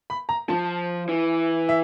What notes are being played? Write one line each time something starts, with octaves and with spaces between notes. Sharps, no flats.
B5
A#5
F3 A5
E3
E5